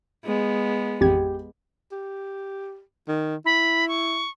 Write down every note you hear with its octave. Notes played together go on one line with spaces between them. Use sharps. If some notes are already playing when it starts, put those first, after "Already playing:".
G#3 B3
A1 F2 G4 G#6
G4
D#3
E4 B5
C#6